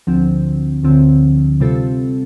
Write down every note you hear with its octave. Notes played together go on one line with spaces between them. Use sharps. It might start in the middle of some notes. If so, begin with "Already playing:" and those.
D2 D3 F3 C4
D2 D3 F3 C4
C3 G3 C4 F4 A4